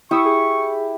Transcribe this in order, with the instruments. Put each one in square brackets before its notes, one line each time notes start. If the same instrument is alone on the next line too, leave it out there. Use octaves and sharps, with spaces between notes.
[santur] E4 G4 E5 [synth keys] G5 D#6 E6 [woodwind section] C#6
[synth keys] G#4